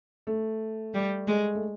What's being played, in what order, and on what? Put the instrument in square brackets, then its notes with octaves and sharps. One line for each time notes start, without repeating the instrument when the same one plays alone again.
[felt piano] A3
[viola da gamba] G3
G#3
[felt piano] A3